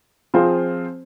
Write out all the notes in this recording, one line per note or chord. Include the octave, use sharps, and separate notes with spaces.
F3 C4 F4 G#4 C5